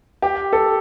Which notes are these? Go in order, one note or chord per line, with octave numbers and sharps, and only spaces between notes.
G4
A4